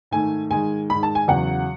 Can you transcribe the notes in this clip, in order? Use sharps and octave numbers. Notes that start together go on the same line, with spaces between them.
G#2 D#3 A3 G#5
G#2 D#3 G#3 G#5
G#2 D#3 G#3 B5
A5
G#5
E2 C#3 F#3 F#5